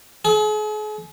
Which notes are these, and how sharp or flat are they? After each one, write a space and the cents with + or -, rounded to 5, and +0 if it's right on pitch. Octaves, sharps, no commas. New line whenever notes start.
G#4 +40